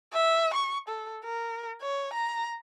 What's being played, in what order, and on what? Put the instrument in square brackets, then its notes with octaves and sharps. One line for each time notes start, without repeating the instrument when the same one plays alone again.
[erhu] E5
C#6
A4
A#4
C#5
A#5